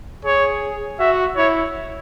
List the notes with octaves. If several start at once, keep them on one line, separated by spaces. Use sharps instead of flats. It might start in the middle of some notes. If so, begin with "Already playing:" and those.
G#4 C#5
F#4 E5
E4 C#5